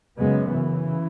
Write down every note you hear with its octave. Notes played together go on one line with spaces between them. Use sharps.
F#2 C#3 G#3 B3
C#3 E3